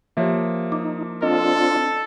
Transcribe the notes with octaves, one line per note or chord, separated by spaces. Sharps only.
F3 A#3 G4 C#5 E5
D#4 D6
C4 D4 F4 A4 D#5